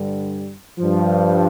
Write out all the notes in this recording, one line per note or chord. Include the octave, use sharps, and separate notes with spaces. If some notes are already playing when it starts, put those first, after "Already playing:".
Already playing: G2 D3 G3
G2 F3